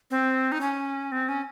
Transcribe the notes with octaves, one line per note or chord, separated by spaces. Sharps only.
C4
D#4
C#4
C4
C#4